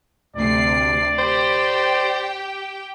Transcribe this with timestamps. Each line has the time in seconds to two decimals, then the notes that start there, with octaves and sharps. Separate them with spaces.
0.36 D2 C3 D5 C7
1.19 G4 C5 G5